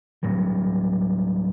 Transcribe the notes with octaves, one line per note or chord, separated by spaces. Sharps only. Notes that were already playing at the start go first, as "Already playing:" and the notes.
A2 F#3 G3